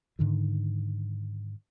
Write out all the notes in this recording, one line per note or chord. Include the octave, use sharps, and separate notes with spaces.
G#2 D3 D#3